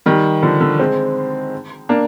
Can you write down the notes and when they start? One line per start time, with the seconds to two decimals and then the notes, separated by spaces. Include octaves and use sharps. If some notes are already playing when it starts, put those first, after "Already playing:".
0.06 D#3 G3
0.42 D3 F3
0.61 D3
0.79 G#3 C4
1.89 A#3 D4